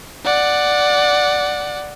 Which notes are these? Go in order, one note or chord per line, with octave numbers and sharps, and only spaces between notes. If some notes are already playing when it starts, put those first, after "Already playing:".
D5 F#5